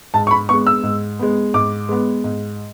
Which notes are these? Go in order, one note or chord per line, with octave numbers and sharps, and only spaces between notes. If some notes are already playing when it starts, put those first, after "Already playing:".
G#2 A5
C#6
B5
G#3 B3 C#6
E6
G#2
G#3 B3
G#2 D6
G#3 B3
G#2